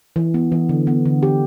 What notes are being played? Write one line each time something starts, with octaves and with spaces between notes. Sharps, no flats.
E3
B3
E3
D3
B3
D3
G4